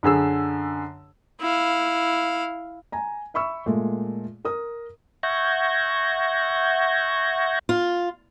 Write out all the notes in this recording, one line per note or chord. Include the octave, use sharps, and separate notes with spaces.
F#2 D3 G#4 E6
E4 F5
G#5 A#5
E5 B5 C#6 E6
A#2 G#3 A3
A#4 D#6
E5 F#5 C#6 G6 G#6 A#6
F4